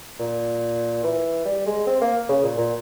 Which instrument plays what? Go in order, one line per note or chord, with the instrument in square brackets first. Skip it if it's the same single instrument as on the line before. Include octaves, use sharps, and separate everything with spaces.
[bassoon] A#2
E3
G3
G#3
C4
A#3
C#3
A#2
A#2